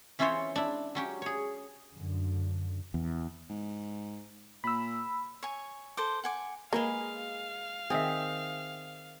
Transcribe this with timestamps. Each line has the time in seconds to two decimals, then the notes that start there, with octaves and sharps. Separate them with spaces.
0.19 E3 C#4 E4 F4 C5 C#5
0.56 D4 E4
0.95 F#3 C#4 G4
1.22 G#4 C#5
1.93 F#2 D3
2.94 E2
3.50 G#2
4.64 A#2 B5 E6
5.43 C#5 G#5
5.97 A4 C5 D6
6.24 F#5 G#5 D6
6.73 G#3 A#3 G#4 B4 F5
7.90 D#3 C4 G#4 E5